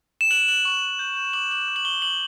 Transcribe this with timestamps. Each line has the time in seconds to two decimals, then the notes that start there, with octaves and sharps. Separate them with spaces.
0.21 E7
0.31 F#6 F#7
0.48 F#6 F#7
0.65 C#6
0.82 F#6
0.99 G6
1.17 G6
1.33 D6 F#7
1.51 D6 F#7
1.68 F#6
1.76 F#7
1.85 C#6 G7
2.02 C#6 F#7